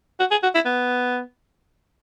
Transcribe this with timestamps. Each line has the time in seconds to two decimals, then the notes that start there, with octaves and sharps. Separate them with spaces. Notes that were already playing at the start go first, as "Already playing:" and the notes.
0.20 F#4
0.31 G#4
0.43 F#4
0.55 E4
0.66 B3